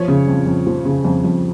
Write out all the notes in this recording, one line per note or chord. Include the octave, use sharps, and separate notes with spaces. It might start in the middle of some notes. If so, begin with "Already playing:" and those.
Already playing: F3 C#5
C#3
F2
F2
F3
C#3
F2
F2